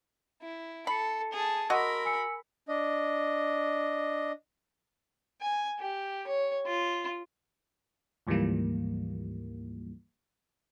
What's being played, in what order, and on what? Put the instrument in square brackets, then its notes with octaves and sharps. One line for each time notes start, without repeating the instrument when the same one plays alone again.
[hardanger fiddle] E4
[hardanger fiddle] A4 [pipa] B5 [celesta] C7 C#7
[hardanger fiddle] G#4 A5
[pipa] F#4 D#5 [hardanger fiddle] A#4 B5 [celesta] C6 E6 A#6
[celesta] G#5 E6 C#7
[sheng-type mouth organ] D4 D#5
[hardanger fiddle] G#5
G4
C#5
F4
[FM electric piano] D2 G#2 E3 F3 G3 A#3